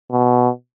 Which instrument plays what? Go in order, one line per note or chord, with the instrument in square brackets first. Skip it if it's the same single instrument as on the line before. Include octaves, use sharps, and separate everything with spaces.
[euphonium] B2